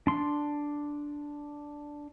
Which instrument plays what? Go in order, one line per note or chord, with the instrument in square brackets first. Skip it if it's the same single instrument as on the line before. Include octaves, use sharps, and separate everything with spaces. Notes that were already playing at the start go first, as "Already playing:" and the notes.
[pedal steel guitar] D4 C6